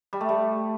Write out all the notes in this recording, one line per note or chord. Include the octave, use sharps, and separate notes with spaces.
G3
A3
G3